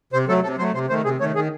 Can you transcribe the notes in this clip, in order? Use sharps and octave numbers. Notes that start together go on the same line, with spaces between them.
C3 C5
F#3 A3 A4
C3 A4
F#3 A3 C5
C3 C5
D#3 A3 C5
C3 G#4
D#3 A3 C#5
D#3 G#4